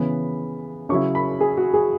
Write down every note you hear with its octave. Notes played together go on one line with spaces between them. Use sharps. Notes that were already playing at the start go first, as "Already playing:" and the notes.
Already playing: C#3 E3 B3 B5
C#3 F#3 E4 C#6
B5
G#4
F#4
G#4